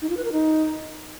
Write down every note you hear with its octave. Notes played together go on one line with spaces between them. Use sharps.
D#4
F4
B4
A#4
D#4